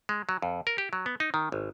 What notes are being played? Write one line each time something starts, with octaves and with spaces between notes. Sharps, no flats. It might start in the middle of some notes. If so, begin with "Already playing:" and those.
G#3
F#3
F2
A#4
G4
F#3
B3
D#4
D#3
G#1